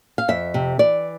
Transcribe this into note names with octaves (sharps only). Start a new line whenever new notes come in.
F5
F2 E5
C3
E3 D5